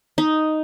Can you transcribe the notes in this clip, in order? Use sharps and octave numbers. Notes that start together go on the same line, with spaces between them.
D#4